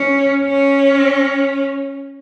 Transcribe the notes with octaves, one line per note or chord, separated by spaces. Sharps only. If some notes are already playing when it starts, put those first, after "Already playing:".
Already playing: C#4
C#4